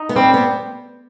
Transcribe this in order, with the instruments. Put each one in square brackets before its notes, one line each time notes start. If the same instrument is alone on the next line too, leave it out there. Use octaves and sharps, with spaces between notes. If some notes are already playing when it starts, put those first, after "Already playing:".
Already playing: [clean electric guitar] D#4
[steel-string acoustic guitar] B3
[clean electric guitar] G3 [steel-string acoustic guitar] C4
[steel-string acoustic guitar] B3